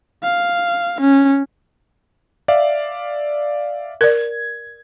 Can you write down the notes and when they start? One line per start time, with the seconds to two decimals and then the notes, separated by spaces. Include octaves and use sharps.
0.23 F5
1.01 C#4
2.48 D5 E5 F5
4.01 A#4 D5 G#6